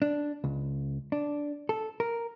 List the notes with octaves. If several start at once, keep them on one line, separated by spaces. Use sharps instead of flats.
D4
C#2
D4
A4
A#4